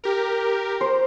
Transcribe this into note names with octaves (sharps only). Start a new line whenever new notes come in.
G4 A#4
C5